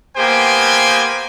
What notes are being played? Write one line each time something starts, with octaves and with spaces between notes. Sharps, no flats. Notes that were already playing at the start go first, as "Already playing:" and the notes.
A#3 B3 G4 C5 G5 G#5